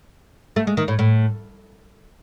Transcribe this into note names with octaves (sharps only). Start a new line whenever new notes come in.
A3
G#3
D#3
A2
A2